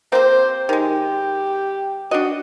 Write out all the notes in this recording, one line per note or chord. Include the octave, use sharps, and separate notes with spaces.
A#3 C4 G4 C5
D#3 G#3 G4
D4 F#4 D#5